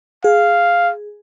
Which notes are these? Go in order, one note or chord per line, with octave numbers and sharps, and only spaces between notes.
G#4 F5